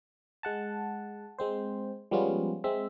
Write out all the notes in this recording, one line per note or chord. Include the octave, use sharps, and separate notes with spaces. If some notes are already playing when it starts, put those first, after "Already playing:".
G#3 F#5 A5
G#3 C4 C5
F3 G3 G#3 B3 C#4 F4
G#3 C4 E5